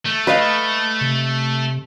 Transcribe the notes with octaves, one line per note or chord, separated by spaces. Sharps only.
A3
B4 D#5 F5
C3